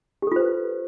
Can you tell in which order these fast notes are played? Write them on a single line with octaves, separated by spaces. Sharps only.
G4 A4 F4 C5 B4